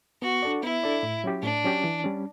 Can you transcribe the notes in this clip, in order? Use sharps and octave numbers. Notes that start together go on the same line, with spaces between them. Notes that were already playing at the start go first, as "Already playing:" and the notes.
B3 F#4
D4 A4 D5
B3 E4
D4 A4 D5
A2
F#3 C#4 G4
A2 D4
F#3 C#4 G4
E3
G3 C#4